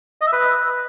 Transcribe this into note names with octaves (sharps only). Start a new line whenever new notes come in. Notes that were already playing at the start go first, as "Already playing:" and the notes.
D#5
E5
B4